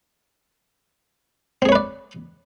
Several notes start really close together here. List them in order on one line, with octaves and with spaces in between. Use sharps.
C4 G#4 C#5 B4 D5